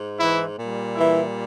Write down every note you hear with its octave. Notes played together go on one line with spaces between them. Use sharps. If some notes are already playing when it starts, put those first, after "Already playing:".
Already playing: G#2
E3 E4
A#2 G3
E3 E4